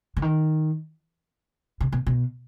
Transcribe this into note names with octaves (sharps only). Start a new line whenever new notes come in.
D3
D#3
C3
B2
B2